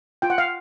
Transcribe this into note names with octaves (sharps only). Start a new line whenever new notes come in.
F4 G5
F#5
F5